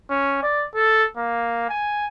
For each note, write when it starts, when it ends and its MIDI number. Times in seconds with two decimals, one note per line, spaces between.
0.10 0.38 61
0.43 0.66 74
0.75 1.04 69
1.17 1.67 58
1.69 2.08 80